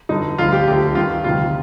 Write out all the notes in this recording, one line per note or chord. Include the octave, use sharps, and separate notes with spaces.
G2 D3 D#4
D2 D3 F4
G4
D2 D3 G4
G2 D#3 F4
D2 C3 D#3 F4